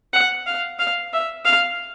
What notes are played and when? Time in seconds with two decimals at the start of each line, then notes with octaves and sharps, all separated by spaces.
0.13 F#5
0.46 F5
0.79 F5
1.13 E5
1.45 F5